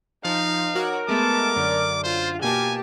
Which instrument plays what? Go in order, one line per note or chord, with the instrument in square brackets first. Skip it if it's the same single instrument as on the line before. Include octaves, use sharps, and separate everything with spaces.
[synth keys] F3 [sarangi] D#4 [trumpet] F5
[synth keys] F#4 C#5 D6 [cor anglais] A#4
[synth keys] G#3 A3 B3 [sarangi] A5 [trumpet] D6
[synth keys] F#2 D3 [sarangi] D5
[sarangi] F4 [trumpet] C5
[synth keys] B2 A#3 A5 [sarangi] G4 [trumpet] G#5